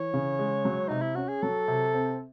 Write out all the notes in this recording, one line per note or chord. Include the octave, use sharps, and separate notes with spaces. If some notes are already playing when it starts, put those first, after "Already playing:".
Already playing: E3 C#5
C#3
G#3
F#3
C3 D#4
E4
C#4 F#4
G#4
F#3 A4
C3
C4